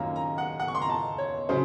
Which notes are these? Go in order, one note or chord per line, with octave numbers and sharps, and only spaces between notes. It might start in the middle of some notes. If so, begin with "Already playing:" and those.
Already playing: F#2 D#3 A#3 C#4 F4 A#5
A#5
F#5
F#5
C#6
C6
A#5
A5
C#5
C#3 F#3 C5